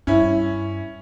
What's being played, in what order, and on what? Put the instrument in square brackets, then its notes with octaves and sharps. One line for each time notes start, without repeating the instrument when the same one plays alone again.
[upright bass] G2 [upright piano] C#4 E4